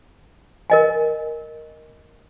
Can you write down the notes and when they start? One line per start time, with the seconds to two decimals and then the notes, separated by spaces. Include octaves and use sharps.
0.70 A#4 D#5 G#5